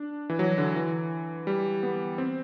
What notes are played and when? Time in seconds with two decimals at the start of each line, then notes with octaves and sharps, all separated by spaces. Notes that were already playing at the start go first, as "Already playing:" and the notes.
Already playing: D4
0.30 E3
0.39 F#3
0.58 D3
0.76 E3
1.47 G3
1.83 B3
2.18 C4